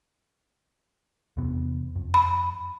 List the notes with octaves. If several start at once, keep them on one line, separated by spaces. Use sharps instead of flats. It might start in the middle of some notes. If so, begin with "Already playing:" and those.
E2 C3 B3
F2
B5